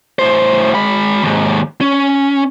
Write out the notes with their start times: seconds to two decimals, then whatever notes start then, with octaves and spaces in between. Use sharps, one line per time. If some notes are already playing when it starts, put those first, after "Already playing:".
0.19 A2 C5
0.75 G#3 B5
1.24 D#2 G#2
1.81 C#4